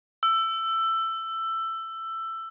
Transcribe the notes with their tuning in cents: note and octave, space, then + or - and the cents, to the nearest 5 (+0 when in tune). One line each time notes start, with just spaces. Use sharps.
E6 +15